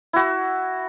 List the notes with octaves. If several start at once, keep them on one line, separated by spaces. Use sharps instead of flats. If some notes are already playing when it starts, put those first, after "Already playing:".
E4 F#4